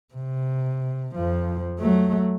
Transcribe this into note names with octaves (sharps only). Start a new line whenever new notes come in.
C3
F2 F3
F#3 A3